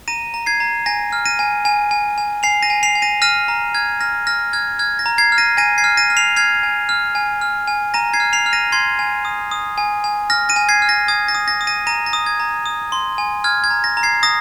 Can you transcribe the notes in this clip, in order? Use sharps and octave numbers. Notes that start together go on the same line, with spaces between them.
A#5 A#6 D#7
A#5
G#6 C7
A#5
G#5 A#6
F6
A#6 D#7
G#5
G#5
G#5
G#5
G#5 C7 F7
A#6 D#7
G#5
C7 F7
G#5
A#6 D#7
F6 A#6 D#7
A#5
F6 G#6
F6 A#6
F6 A#6
F6 G#6
F6 G#6
A#6
A#5
G#6 C7
F6
A#6 D#7
G#5 A#6 D#7
G#6 C7
F6
A#6 D#7
F6
C7 F7
F6 G#6 C7
G#5
F6
G#5
F6
G#5
A#5 A#6 D#7
G#6 C7
F6
C7 F7
F6
A#6 D#7
C6 G#6 C7
G#5
D#6
D#6
G#5
G#5
F6 A#6
A#6 D#7
G#5
G#6 C7
F6
A#6
D#6 G#6
A#6
D#6
A#6
D#6
A#6 D#7
A#5 A#6 D#7
A#6
D#6
G#6
A#5
D#6
C6
G#5
F6 G#6
G#6
A#5
A#6
A#5
G#6 C7
D#6 A#6